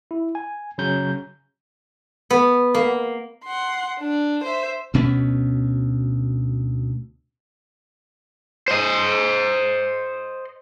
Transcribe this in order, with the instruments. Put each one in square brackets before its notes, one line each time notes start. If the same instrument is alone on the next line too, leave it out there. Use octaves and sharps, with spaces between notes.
[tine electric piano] E4
G#5
C#3 F#3 C#4 A#5 G6
[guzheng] B3
A#3
[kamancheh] F#5 C6
D4
C5 E5
[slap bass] D2 B2 B3 C#4
[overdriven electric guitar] C5 D#5